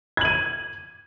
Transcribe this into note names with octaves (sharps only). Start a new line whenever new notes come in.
G#6 D#7 F#7